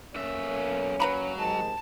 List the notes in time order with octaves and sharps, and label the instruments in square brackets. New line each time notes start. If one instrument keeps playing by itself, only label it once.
[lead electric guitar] B1 E5 [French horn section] A#3 C#4
[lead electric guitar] F#3 [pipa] B4 A#5 B5
[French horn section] C3 D#3 G#3 [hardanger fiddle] A5